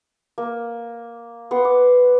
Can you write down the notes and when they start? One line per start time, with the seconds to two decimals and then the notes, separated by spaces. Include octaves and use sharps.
0.38 A#3
1.51 B3 F#5 C6
1.65 D6